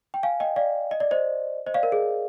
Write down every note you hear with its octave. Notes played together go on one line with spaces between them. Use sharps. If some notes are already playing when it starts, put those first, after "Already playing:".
G5
F5 G#5
D#5 G5
D5 F5
D#5
D5
C5 D#5
C5 D#5
D5 F5
A#4
G#4